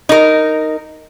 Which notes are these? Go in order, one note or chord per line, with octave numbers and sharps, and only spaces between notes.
D#4 A#4